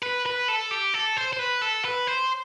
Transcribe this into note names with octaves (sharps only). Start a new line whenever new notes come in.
B4
B4
A4
G4
A4
C5
C5
B4
A4
B4
C5